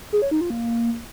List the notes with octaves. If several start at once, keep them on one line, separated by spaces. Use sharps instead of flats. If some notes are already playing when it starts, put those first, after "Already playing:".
G#4
C#5
D#4
F4
A#3